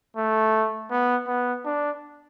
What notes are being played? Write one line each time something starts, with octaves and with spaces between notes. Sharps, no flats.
A3
B3
B3
D4